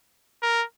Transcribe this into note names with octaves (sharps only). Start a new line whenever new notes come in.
A#4